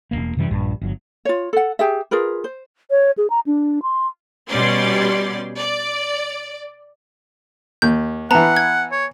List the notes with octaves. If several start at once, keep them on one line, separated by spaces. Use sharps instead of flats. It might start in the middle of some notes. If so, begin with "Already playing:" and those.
E1 D#2 A#3
F#2 C3 E3 G3
A#1 G2
G1 F#3
F4 C#5
A4 F#5
G4 G#4 E5
F4 G#4 A#4 B4
C5
C#5
G#4
A#5
D4
C6
B2 G3 C#4 D5 C6
D5
D#2 G6
E3 B3 F#5 A5 A#5
G#6
C#5